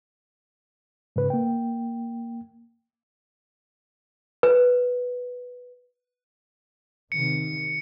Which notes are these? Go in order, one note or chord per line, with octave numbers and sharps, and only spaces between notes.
G#2 C#3 B4
A#3 G5
B4
C3 D#3 C#7